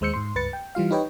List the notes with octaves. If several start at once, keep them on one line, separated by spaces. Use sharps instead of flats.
D#2 G#3 C5 E6 G6 C#7
G#2 C6
C#2 G2 B4 A6 C#7
G5
E3 G3 F4 F5
D#4 G4 B4 C#5 D#5 G5